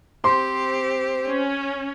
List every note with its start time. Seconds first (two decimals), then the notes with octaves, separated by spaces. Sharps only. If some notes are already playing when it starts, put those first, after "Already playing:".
0.24 C4 G4 C5 C6
1.26 C#4